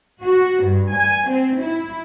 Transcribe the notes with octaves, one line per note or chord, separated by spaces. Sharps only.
F#4
G2
G#5
C4
E4